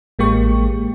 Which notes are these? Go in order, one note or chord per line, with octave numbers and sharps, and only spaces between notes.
A1 G#3 A#3 G4 C#6